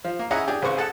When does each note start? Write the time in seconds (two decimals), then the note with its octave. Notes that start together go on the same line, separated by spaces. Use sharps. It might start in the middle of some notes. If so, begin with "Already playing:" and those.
0.04 F3
0.19 A#3
0.31 C#4 E4 G#4 D#5 F#5 A#5
0.48 D4 G4 G#4
0.62 A1 C#3 C4 B4 C5 C#6
0.77 G#4 A4 F#5 A5